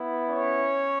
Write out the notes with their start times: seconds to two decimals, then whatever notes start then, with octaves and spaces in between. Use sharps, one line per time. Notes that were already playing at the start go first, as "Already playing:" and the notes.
Already playing: B3 E4
0.26 C#4 C#5